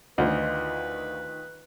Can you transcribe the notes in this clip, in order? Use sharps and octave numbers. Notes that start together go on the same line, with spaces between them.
D2 D#3 F4 B4 D#5